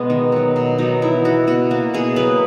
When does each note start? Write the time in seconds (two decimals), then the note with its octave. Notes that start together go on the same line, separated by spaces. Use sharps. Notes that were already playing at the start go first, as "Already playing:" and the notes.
Already playing: B2 G#3 B3
0.10 D#3
0.32 F#3 B3
0.56 B2
0.78 F#3 B3 D#4
1.02 E3 E4
1.25 B3 F#4
1.47 B2 F#4
1.71 A#3 F#4
1.94 B2 G#4
2.16 F#3 A#3 B4